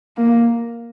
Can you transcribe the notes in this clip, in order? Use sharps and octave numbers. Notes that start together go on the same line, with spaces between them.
A#3